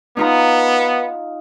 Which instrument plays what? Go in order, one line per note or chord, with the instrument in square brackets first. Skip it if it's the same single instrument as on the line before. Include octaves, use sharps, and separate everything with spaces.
[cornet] B3 [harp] D#4 F4 A#5